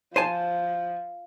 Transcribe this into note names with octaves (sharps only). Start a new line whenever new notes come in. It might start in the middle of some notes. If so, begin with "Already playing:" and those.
F3 C5 G#5 A5